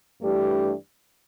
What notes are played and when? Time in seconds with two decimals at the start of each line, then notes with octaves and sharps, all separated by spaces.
0.21 G2 E3 A3 D4 G4